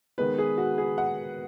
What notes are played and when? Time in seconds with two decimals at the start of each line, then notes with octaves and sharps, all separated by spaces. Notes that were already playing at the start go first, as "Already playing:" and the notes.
0.18 D#3 G#3 B3 B4
0.38 G#4
0.58 F#4
0.78 G#4
0.98 F#5